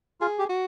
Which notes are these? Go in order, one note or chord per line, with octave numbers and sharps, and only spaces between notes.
F4 G#4
G4
F#4